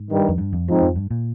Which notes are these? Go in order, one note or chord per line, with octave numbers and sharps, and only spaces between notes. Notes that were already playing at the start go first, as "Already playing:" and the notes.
Already playing: G#2
G2 D#3 G3
F2
G2
F2
G#2 F3 C4 D#4
F2
G2
A#2